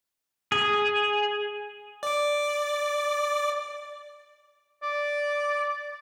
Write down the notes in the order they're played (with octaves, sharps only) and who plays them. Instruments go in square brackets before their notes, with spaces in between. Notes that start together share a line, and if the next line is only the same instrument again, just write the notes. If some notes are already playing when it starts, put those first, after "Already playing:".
[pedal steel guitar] G#4
[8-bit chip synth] D5 D6
[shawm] D5